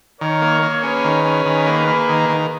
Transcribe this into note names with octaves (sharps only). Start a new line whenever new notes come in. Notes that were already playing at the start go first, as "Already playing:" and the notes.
D#3 A#4 C#5
A#3
A#3
C#4 G#4 B4
D#3
C#4
D#3
A#3
A#3
D#3
D#3